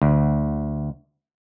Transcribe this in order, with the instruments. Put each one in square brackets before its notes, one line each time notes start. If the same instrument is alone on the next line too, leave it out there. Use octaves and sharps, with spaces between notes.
[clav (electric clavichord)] D2